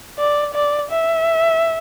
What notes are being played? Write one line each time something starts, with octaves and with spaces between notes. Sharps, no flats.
D5
D5
E5